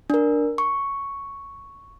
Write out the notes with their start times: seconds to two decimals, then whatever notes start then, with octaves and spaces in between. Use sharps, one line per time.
0.10 D4 A#4
0.58 C#6